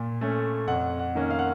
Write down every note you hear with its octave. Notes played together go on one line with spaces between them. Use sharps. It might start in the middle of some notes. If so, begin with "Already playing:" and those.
Already playing: A#2
A3 C#4
F2 F#5
F#5
D#3 A#3 C#4
F5
F#5